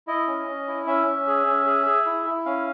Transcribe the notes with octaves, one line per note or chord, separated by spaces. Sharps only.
E4 D#5
C#4
C#4
E4
C#4 E5
C#4
G#4
C#4
G#4
G#4
E4
E4
C#4 F5